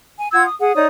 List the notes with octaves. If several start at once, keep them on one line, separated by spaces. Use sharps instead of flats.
G#5
F4 F#5 E6 G#6
D#6
G#4 F#5
D#4 C#5 D5 D#6